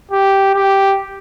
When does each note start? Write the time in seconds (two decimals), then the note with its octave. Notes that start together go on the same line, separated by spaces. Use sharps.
0.11 G4
0.55 G4